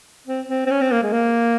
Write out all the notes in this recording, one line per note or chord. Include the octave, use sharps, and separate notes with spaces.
C4
C4
C4
C#4
C4
A#3
G#3
A#3